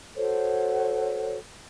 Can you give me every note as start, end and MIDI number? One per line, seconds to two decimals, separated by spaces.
0.16 1.36 66
0.16 1.36 69
0.16 1.36 72
0.16 1.36 73